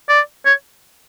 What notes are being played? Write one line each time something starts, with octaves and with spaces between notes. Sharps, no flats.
D5
C#5